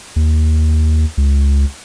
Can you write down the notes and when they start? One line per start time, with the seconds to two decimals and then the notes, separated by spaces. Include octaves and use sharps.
0.16 D#2
1.17 C#2